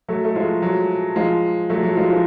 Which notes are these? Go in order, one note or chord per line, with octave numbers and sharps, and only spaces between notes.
F#3 A3
A3
F3 G#3
F#3
F3 G#3
F#3 A3
F#3
F3 G#3
F3